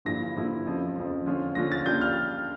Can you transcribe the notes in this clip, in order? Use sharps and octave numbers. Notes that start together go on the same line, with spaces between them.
G2 D3 F3 A#3 E4 A#6
G2 D3 F3 A#3 E4
F2 C#3 F3
F2 C#3 F3
D3 F3 C#4 F4
D3 F3 C#4 F4 A#6
A6
C#3 G3 A#3 D4 F4 G6
F6